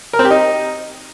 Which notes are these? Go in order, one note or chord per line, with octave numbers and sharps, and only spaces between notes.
A#4
C4
G4
D#4